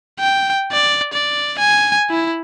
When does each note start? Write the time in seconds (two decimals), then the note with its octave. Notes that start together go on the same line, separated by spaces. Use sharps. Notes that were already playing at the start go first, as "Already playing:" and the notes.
0.20 G5
0.72 D5
1.13 D5
1.59 G#5
2.10 E4